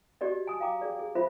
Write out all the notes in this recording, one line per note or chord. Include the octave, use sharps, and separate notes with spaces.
F#4 G4 D5 D#5
G#5 D#6
F5 G5 A#5 D6
G#4 D5
G#4
F4 C5 E5 B5